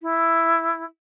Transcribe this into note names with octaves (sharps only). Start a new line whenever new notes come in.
E4